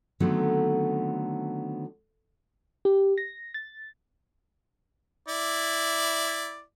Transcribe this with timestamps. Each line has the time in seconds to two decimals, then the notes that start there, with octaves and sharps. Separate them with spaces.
0.20 D3 D#3 F#3 A3 B3 C4
2.85 G4
3.18 A#6
3.54 A6
5.28 E4 D5